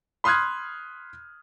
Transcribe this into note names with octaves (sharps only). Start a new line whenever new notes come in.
B5 C6 D#6 F6 F#6 G#6